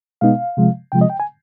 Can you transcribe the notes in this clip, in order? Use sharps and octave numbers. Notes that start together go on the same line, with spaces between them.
B2 G#3 B3 D#4 F5
C3 F3 G#3
C3 F3 G#3 G5
D#5
G5
G#5